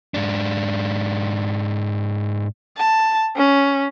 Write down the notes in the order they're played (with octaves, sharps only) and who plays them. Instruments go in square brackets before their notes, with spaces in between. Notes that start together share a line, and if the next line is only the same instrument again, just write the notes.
[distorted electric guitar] G#2 D4
[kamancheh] A5
C#4